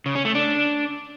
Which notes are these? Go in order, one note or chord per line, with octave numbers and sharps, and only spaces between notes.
C#3
C#4
A3
D4